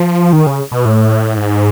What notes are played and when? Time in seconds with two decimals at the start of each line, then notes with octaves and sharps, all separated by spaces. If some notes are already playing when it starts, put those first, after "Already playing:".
Already playing: F3
0.33 D#3
0.47 C#3
0.72 B2
0.85 A2
1.37 G#2